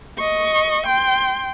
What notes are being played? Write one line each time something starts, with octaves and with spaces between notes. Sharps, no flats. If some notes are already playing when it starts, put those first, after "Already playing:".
D#5 C#6
G5 C6